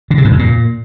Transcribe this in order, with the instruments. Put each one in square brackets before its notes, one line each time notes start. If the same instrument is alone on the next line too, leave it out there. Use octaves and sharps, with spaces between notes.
[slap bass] D3
C3
G#2
F2
A#2